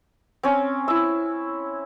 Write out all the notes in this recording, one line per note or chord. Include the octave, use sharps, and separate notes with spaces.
C4 C#4
E4 E6